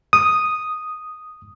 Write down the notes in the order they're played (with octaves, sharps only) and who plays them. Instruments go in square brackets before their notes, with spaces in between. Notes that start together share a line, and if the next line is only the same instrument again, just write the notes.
[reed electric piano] D#6